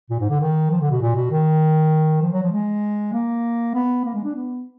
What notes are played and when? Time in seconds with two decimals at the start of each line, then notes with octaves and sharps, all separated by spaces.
0.10 A#2
0.20 G#2
0.30 D3
0.41 D#3
0.70 F3
0.81 D3
0.91 B2
1.01 A#2
1.15 B2
1.31 D#3
2.22 F3
2.32 F#3
2.43 F3
2.52 G#3
3.13 A#3
3.75 B3
4.05 A#3
4.15 G#3
4.24 D4
4.35 B3